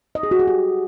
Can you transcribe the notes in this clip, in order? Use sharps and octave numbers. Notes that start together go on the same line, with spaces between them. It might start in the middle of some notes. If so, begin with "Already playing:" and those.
D#5
G#4
F#4
G#4
G4